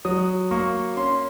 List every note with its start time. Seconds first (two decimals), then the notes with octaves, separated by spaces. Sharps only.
0.05 F#3 D#6
0.51 A#3 C#6
0.97 C#4 C6